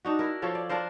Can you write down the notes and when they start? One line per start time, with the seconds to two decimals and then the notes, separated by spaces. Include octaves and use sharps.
0.05 D4 D#4 F#4
0.19 E4 A#4
0.42 F3 F4 A4 C#5
0.55 D5
0.69 D4 F4 A#4 C5